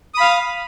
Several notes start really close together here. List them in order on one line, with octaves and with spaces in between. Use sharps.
D#6 B5 F5